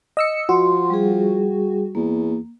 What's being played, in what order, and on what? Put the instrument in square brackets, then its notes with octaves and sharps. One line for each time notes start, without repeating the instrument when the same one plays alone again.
[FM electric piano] D#5 E6 C#7
[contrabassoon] F3 [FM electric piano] F#4 [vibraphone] C6
[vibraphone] G3 G#4
[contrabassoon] E2 [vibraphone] A#3